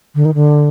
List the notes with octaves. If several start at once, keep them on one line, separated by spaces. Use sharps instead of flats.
D3
D#3
D3